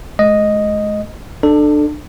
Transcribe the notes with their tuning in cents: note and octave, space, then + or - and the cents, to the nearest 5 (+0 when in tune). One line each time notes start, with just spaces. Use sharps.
G#3 +35 D#5 +0
D4 +25 A4 +0